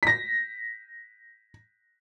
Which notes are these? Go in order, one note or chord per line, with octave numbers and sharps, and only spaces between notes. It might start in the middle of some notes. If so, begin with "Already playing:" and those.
A#6 B6